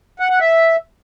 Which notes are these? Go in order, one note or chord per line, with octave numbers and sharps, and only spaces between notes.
F#5
F#5
E5